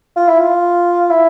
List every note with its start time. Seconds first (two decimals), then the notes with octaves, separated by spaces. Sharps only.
0.16 F4
0.28 E4
0.39 F4
1.10 E4